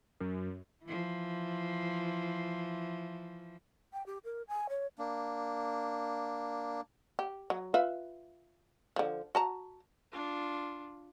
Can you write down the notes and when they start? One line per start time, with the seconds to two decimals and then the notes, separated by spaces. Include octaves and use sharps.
0.20 F#2
0.84 E3 F3
3.93 G5
4.06 G4
4.24 A#4
4.48 G#5
4.69 C#5
4.98 A#3 D4
7.19 G4
7.50 F#3
7.74 F4 B4 E5
8.96 D3 F3
9.35 F#4 A5 A#5
10.12 D4 F4